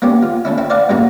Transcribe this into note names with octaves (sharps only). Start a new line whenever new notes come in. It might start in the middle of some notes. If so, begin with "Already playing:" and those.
A#3 B3 C#4 G4
F4
A3 C#4 E4
C4 E4
C5 D5 F5 F#5 A5
A1 G2 A#3 F#4 A#5